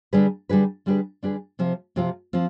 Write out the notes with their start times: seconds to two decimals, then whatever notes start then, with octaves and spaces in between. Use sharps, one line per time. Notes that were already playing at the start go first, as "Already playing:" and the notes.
0.13 D3 G3 D4 G#4 B4
0.49 D3 G3 D4 G#4 B4
0.86 D3 G3 D4 G#4 B4
1.23 D3 G3 D4 G#4 B4
1.59 C3 F3 C4 F4
1.96 C3 F3 C4 F4
2.33 F3 C4 F4